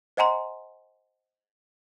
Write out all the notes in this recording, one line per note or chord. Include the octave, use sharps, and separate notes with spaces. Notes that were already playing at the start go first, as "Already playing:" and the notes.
C5 D#5 F#5 G#5 A#5 C6